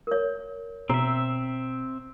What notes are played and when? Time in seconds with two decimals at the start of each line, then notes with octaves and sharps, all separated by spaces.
0.07 A#4 C#5
0.90 B2 C4 E5 A#5